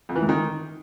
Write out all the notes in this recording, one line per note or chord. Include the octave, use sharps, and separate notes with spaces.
F2
E3
G#2
D#3